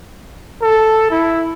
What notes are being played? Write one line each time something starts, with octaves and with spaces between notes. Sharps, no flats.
A4
E4